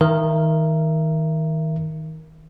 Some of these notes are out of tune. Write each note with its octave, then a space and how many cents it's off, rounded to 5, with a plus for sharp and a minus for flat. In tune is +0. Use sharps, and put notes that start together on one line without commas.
D#3 +25 A#4 +5 E5 +25